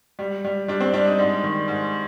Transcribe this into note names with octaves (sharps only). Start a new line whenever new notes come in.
G3
G3
G3 D4
C4
G3 D4
D#4
G#2 D4
D#3
G#2